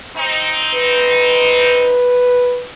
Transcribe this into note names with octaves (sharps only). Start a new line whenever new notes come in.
C4 D#4
B4